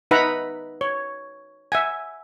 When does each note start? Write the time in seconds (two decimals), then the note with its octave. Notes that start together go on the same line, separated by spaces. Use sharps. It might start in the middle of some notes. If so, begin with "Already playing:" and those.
0.11 D#4 B4 E5 F#5 A#5 B5
0.81 C#5
1.72 E5 F#5 G#5